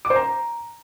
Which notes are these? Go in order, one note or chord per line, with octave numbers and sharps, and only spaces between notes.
D6
C5
A#5